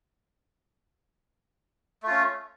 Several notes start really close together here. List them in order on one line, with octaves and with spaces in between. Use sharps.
A3 F4 C#4